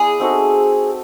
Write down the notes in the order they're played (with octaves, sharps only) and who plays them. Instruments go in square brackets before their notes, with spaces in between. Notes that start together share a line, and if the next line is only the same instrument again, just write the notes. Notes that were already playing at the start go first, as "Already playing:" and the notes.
Already playing: [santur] B3 E4 D5 [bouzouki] G#4
[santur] C4 D#4 F#4 A4